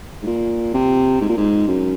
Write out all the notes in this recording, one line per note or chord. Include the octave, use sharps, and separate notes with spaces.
G#2
A#2
C3
G#2
A#2
G#2
F#2